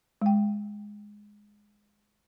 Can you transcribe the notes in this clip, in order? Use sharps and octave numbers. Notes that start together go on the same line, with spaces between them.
G#3 G5